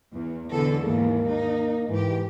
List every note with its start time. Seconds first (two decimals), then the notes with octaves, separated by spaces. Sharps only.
0.14 E2
0.51 E2 B2 D3 A4
0.83 D#2 G#2 E3 A#3
1.28 D#4
1.89 G#2 E3 G4